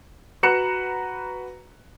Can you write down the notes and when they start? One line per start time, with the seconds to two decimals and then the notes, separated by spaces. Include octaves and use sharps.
0.43 F#4 B4 A#5 F#6 C#7 E7